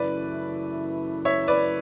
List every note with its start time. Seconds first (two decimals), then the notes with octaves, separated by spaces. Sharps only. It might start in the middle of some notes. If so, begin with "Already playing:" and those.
Already playing: F#2 C#3 E3 A3 E4 B4 D5
1.25 C#5 E5
1.48 B4 D5